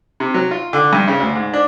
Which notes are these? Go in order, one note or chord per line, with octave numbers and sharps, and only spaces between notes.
C3
F#3
F4
D3
G2
C#3
D2
G#2
D4